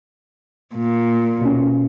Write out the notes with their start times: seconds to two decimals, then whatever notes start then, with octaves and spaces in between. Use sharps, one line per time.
0.74 A#2
1.41 B2 C#4